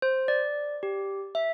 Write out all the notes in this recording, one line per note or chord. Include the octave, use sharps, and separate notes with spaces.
C5
D5
G4
E5